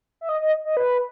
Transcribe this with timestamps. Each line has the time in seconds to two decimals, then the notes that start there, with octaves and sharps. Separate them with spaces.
0.21 E5
0.29 D#5
0.41 D#5
0.65 D#5
0.77 B4